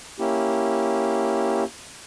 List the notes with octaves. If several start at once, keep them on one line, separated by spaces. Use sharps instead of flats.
A#3 C#4 E4 G4